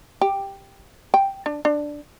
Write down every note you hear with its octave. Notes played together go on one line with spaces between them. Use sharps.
G4
G5
D4
D4